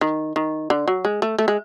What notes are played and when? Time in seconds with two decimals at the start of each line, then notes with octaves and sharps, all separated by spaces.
0.01 D#3
0.36 D#3
0.70 D3
0.88 F#3
1.05 G#3
1.22 A3
1.38 A3
1.48 G#3